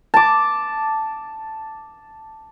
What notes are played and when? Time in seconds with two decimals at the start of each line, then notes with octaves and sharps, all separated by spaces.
0.14 A5 D6